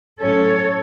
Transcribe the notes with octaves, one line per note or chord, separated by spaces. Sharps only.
A2 F#3 C#4 A4 C#5